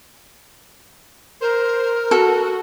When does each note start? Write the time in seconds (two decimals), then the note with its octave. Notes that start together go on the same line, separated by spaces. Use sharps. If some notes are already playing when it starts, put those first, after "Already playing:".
1.41 A#4 C5
2.11 F#4 A4